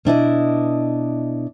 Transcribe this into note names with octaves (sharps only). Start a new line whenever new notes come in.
B2 D4 E4 D#5